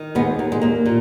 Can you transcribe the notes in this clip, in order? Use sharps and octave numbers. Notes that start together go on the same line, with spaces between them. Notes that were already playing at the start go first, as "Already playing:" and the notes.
Already playing: D#3
D#2 G#3 B3
D#2
G#3
D#2 A#3
A#2